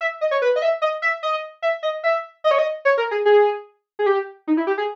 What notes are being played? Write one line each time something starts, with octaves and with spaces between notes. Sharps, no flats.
E5
D#5
C#5
B4
D#5
E5
D#5
E5
D#5
E5
D#5
E5
D#5
C#5
D#5
C#5
A#4
G#4
G#4
G#4
G4
D#4
E4
G4
G#4